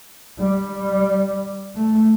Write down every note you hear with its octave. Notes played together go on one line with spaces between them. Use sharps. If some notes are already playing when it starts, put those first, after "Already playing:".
G3
A3